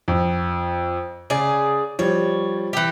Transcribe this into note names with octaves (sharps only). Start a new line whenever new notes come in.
F2
C#3 G#4 D5
F3 G3 C#5
E3 G4